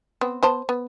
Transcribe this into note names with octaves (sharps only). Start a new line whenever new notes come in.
B3 C4
B3 C5 A5
B3